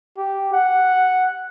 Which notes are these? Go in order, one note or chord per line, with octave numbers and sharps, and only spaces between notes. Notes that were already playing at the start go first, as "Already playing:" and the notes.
G4
F#5